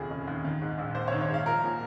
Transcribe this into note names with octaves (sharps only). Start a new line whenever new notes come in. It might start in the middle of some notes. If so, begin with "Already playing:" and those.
Already playing: F1 D#2 C#3 F3 G#4
C#3
D#2
D#3
G#2
A#1
A#1 C5
C#5
D#3
C#5
G#2 F5
F3 A#4
A#2